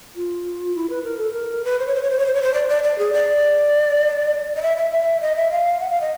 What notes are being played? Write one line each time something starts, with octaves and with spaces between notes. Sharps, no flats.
F4
E4
B4
A#4
A4
A#4
B4
C5
C#5
C5
C#5
C5
C#5
C5
C#5
C5
D5
D5
D5
G#4
D5
D#5
E5
E5
E5
D#5
E5
F5
F#5
F5
D#5